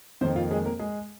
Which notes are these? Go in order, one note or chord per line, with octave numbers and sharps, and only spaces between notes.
F2 D#3 A#3 C4 C5
F4
G#3 G#4
A#3 A#4
G#3 G#4